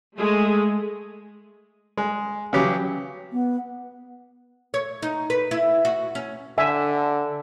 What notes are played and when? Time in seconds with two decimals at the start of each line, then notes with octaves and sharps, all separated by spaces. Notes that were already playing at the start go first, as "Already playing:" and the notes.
0.17 G#3 A3
1.97 G#3
2.53 C#3 E3 F#3 G4
3.32 B3
4.74 C#5
5.03 D#4
5.30 B4
5.51 E4
5.85 F#4
6.15 C#4
6.58 D3 E5 G#5